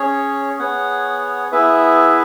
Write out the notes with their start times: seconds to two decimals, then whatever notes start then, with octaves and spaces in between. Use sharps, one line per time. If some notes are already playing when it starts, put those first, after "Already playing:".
Already playing: C#4 G#4 C#5
0.59 B3 G#4 C#5 F#5
1.52 B3 E4 G#4 B4 E5